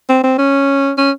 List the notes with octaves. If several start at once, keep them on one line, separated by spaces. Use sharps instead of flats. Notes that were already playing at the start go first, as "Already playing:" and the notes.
C4
C4
C#4
C#4